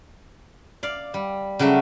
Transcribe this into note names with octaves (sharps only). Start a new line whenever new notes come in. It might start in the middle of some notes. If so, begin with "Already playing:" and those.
D5 F5
G3
C#3 F#3 G3 A3 C#4